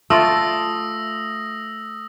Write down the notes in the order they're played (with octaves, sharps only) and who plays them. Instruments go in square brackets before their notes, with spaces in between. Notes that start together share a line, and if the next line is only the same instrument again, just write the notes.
[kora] A3 F4 D5 [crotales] D#6 E6 A#6